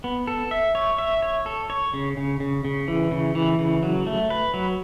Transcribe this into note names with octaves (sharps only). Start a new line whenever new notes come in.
B3
A4
E5
C#5
E5
C#5
A4
C#5
C#3
C#3
C#3
C#3
E3
C#3
E3
C#3
F#3
A3
B4
F#3